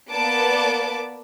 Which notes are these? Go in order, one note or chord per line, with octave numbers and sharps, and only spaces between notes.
A#3 B3 D5 A5 D6 D7